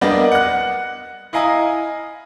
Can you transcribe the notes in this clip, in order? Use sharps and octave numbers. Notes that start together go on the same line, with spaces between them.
G3 A#3 B3 D4 D5 D#5
F#5 F#6
E4 D#5 F5 G#5 A#5 D#6